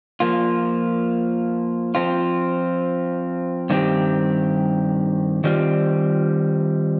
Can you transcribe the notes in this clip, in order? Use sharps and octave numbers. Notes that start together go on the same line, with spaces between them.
F3 A#3 F4
F3 C4 F4
G2 D#3 C4 G4
D#3 G3 C4 F4